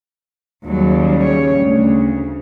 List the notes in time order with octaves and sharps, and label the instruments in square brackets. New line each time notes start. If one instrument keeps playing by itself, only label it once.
[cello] D#2 F#3 [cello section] C#3 G3
[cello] C#5
[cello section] D2 [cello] C#3